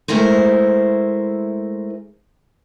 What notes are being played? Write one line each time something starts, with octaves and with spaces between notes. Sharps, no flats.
G#3 A3 E4 A#4 C5